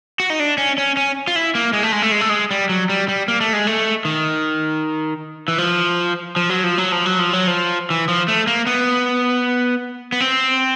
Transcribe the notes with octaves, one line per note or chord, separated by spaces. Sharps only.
F#4
D#4
D4
C#4
C#4
C#4
F4
E4
A#3
G#3
A3
G#3
A3
G#3
A3
G#3
G3
F#3
G3
G3
A#3
A3
G#3
A3
D#3
E3
F3
F3
F#3
F3
F#3
F3
F#3
F3
F#3
F3
E3
F3
A3
A#3
B3
B3
C4